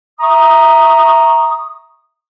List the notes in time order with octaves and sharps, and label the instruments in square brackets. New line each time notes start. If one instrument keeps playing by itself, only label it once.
[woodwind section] E5 A#5 C#6 D#6